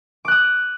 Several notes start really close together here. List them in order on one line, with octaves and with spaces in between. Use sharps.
D6 F#6 D#6